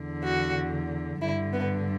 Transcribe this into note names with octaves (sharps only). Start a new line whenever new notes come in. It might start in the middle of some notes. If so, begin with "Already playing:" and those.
Already playing: E2 D3
F#4
G2 D3 E4
B3